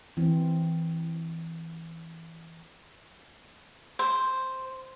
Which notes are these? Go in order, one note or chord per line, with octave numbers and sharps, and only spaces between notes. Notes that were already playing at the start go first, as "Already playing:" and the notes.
E3 C4
C5